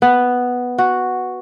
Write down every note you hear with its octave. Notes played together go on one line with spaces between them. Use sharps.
B3
F#4